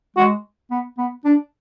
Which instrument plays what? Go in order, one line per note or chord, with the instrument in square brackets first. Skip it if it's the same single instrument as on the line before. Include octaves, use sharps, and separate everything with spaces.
[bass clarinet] G#3 [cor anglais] F#4
[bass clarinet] B3
B3
D4